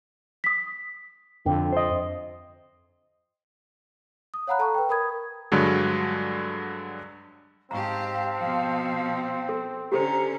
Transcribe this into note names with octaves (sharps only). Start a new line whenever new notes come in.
D#6 B6
F2 D3 G5
C5 D#5
D#6
C#5 F5 F#5 A#5 B5 F#6
A4 A5 A#5 C#6
B4 G5
A#4 B5 D#6 G#6
G2 D3 F#3 G#3
G#2 C4 G4 F5 A5 A#5 C#6
B2 F3
A4
D3 C#4 G4 A4 C5 A#5